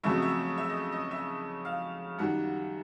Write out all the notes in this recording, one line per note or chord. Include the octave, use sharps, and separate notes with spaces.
F2 C#3 F#3 A3 E5
D#5
E5
E5
D#5
D#5
E5
F5
F#2 D#3 G3 F#5